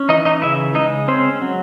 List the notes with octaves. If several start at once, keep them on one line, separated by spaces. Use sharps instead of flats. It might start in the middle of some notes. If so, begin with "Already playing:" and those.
Already playing: C#4
E3 D#4 D#5
D#4 D#5
C#3 E4 E5
G#3 D#4 D#5
C4 C#4 C5
F#3